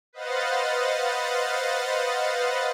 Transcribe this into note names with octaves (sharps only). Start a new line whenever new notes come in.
B4 C5 D#5 F5 F#5 A6